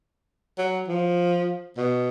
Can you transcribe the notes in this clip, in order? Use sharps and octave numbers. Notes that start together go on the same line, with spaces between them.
F#3
F3
B2